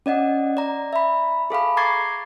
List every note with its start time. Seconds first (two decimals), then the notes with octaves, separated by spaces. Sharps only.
0.06 C#4 D5 D#5 F#5
0.57 D5 A#5
0.93 E5 B5
1.50 G#4 A4 F5 B5
1.77 A#5 C#6 D6 G#6 A6 C7